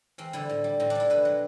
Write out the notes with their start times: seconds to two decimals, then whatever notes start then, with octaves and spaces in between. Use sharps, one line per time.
0.18 E2 C4
0.33 D3 G3 E4
0.49 A2
0.64 G3
0.80 A2 C4
0.90 D4
0.95 G3 E4
1.10 B2 B4
1.25 F#3